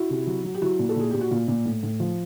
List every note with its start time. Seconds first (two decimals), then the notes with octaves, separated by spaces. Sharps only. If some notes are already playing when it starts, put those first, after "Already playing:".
Already playing: E4 F#4
0.10 C3
0.27 F#3
0.44 F#3
0.55 G4
0.62 F#3 E4 F#4
0.79 A#2
0.89 A4
0.96 A#2 G#4
1.11 A#2 G4
1.21 F#4
1.31 A#2 F4
1.48 A#2
1.65 A2
1.83 A2
2.00 F3